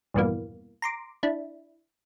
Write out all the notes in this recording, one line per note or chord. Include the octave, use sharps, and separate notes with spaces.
A#1 E2 G2 B2 E3 A#3
A#5 C6 D6
D4 E4